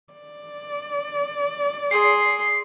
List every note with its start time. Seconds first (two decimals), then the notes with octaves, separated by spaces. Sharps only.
0.14 D5
1.91 G#4 C6 C7